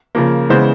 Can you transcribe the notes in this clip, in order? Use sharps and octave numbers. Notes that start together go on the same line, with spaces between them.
C#3 F3 A#3
C#3 E3 G#3 B3 C5